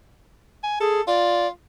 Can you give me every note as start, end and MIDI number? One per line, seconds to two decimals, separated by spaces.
0.63 0.80 80
0.80 1.01 68
0.80 1.02 69
1.07 1.48 65
1.07 1.47 74